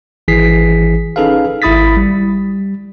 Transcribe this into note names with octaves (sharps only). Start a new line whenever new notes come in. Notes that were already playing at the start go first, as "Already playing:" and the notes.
G#1 E3 G#4 B6 C7
C#4 D#4 G#4 A4 B4 F5
G#1 E4 B5 D#6 A6 B6
G3